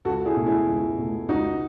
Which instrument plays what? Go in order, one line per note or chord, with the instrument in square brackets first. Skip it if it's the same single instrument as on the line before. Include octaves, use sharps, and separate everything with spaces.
[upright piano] C#2 F#4 A4
E4 G#4
B2 A3
E4 G#4
C#2
B2 A3
C#2 D#4 F#4